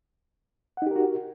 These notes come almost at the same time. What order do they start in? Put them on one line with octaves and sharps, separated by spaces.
F#5 D#4 G4 A#4 F#4